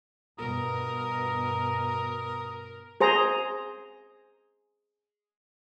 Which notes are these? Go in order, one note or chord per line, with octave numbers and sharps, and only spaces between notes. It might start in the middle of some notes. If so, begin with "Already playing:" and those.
G2 B2 A#4 A#5 D#6
G#4 C5 A#5